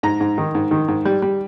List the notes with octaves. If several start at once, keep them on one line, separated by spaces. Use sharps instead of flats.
G#2 A#5
G#2
D#3
G#2
D#3
G#2
G3
G3